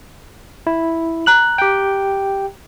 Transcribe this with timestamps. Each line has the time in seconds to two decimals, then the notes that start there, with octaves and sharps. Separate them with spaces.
0.67 E4
1.26 A#5 F#6 F#7
1.58 G4 G5